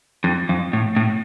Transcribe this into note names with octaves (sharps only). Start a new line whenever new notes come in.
F2
F2
A2
A2